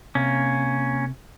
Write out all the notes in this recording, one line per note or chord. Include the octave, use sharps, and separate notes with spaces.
C3 A#3 C#4